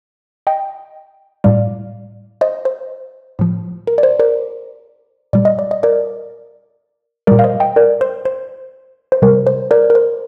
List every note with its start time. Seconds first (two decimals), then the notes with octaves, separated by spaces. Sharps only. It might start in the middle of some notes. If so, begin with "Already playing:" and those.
0.47 D#5 G5
1.44 A2 G3 D5 F5
2.41 C5 D#5
2.65 C5
3.39 A2 F3
3.87 A#4
3.98 D5
4.03 C5
4.19 A#4 D5
5.33 A#2 G3 D5
5.45 D#5
5.59 D5
5.71 D#5
5.83 A#4 D5
7.27 A#2 G3 A#4 D5
7.39 F5
7.44 C5 D#5
7.60 D#5 G5
7.76 A#4 D5
8.01 C5
8.25 C5
9.12 C5
9.22 C3 G3 A#4
9.47 C5
9.71 A#4 D5
9.90 A#4
9.95 C5